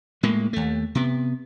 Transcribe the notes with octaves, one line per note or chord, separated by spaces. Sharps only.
A2 G#3 A#3
D#2 A3
C3 B3